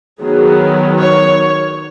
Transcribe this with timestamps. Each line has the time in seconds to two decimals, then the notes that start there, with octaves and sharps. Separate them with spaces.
0.21 D#3 F#3 B3 G#4
0.99 C#5